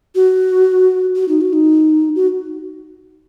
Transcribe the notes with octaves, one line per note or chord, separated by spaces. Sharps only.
F#4
F#4
D#4
F#4
D#4
F#4